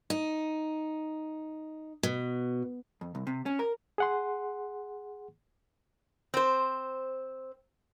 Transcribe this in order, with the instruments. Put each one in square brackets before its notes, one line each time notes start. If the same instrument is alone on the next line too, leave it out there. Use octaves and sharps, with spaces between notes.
[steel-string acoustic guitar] D#4
B2
[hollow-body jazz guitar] F2
C2
C3
C#4
A#4
[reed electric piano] G#4 F#5 C6
[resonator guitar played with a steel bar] C4 C5